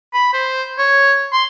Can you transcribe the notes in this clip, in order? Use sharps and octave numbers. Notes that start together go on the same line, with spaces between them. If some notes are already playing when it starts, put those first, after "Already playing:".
B5
C5
C#5
C6